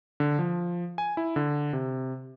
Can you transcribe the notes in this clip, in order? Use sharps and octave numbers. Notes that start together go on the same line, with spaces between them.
D3
F3
G#5
E4
D3
C3